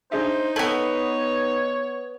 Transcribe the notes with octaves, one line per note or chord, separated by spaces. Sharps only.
D4 D#4 G#4 C5 E5
A3 B3 C#5 A5 G#6